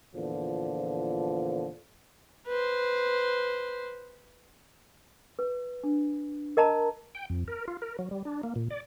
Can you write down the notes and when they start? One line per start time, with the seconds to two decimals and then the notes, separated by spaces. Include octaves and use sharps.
0.15 E2 A#2 D3 F3
2.47 B4 C5
5.39 B4
5.84 D4
6.57 A#4 D#5 A5 A#5
7.15 G5
7.30 F2
7.48 A#4
7.68 F4
7.82 A#4
7.99 F#3
8.11 G3
8.25 D4
8.43 A#3
8.56 A#2
8.70 D5